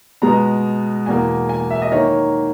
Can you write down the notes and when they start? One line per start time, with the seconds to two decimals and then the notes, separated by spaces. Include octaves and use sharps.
0.22 B2 G#3 B3 A#5
1.06 E2 B2 A#3 G#5
1.49 G#5
1.70 E5
1.82 D#5
1.92 D#3 A#3 C#5